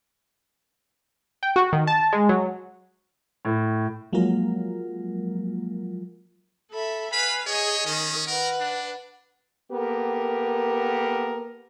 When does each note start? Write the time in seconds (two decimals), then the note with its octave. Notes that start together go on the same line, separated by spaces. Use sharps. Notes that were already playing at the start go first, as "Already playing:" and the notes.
1.43 G5
1.56 F#4
1.73 D#3
1.87 A5
2.13 G#3
2.29 F#3
3.45 A2
4.13 F3 F#3 G#3 A#3 F4 A#4
6.72 A4 E5 B5
7.13 B4 F5 G#5 B5
7.47 G#4 C#5 D#5 G#5
7.86 D#3 C#4
8.27 A#4 B4 F#5
8.60 D4
9.72 A#3 B3 G4 A4 A#4